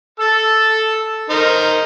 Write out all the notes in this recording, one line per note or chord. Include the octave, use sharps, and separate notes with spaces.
A4 E6
D#4 A#4 C5